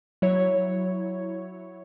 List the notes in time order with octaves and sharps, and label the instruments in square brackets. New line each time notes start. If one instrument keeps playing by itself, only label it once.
[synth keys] F#3 E4 C#5